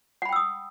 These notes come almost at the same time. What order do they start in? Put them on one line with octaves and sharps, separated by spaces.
F#5 B5 G5 E6 D#6